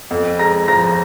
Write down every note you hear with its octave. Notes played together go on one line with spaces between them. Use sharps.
F2
G#3 A#5 A#6
F3 A#5 A#6